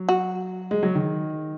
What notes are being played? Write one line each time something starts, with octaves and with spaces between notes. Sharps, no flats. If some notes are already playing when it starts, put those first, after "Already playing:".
Already playing: F#3
F#4
G#3
F#3
D#3